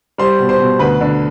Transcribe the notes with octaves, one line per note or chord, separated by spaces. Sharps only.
G3 C5 C6
B2
C5 C6
B2
D2 B4 B5
D3